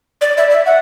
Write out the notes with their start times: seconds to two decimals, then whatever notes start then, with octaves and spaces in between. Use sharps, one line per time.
0.21 D5
0.38 E5
0.51 E5
0.66 F#5